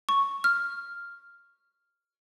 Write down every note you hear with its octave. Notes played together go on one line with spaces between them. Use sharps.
C#6
F6